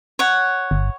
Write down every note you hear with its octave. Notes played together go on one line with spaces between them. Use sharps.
C#5 F#5
G1